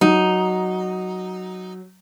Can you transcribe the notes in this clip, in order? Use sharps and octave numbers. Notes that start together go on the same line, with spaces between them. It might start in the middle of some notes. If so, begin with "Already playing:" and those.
F#3 D#4